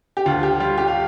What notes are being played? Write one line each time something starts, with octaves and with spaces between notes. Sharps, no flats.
G4
D2 F4
G4
G3 F4
G4
F5